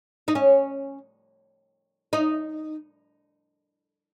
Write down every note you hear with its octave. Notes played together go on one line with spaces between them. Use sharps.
D#4
C#4
D#4